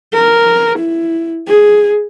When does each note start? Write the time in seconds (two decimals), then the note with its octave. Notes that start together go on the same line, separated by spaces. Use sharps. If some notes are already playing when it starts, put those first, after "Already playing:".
0.14 A#4
0.79 E4
1.48 G#4